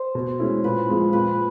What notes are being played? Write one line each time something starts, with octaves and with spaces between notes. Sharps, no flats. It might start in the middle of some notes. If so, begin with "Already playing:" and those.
Already playing: C5
B2
G#3 C#4 E4
A#2 B4
F3 G#3 C4
A#2 B4